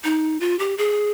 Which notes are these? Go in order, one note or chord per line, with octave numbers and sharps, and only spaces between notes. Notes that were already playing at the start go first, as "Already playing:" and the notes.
D#4
F4
G4
G#4